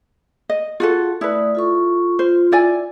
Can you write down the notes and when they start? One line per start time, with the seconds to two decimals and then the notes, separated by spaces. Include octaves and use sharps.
0.49 D#5
0.80 F4 F#4 G#4 A4
1.21 A3 E4 B4 D5 D#6
1.55 F4 A4 C#6
2.19 F4 C5
2.52 E4 D5 G#5